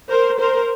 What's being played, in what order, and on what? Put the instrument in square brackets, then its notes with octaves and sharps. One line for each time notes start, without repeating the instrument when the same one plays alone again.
[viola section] A#4 C5
A#4 C5